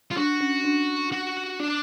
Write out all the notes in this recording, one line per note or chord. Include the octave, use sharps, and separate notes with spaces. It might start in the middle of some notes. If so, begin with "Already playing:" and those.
F4
D4 F#4
C#4
D4
F#4
D4